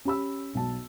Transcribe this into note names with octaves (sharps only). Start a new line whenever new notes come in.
C#4 G4 B5 E6
B1 A5